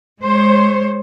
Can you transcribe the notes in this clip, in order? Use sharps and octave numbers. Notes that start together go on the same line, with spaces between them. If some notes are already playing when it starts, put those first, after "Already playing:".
G#3 C5 C#5